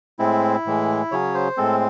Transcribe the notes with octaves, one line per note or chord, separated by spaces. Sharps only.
A2 G#3 C4 E4
A2 E3 G#3
C#3 F#3 C#4 C#5
C5
A2 G#3 C4 A4